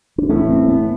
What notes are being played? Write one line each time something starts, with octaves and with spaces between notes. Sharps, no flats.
D4
A2 E3 A3 C#4
C4
B3